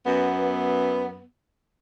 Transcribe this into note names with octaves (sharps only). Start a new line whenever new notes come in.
F#2 B3